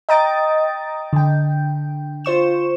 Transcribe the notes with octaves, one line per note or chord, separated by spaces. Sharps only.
D#5 G5 A#5 D#6 A6 D7
D3 G5
F4 C5 C#6 E7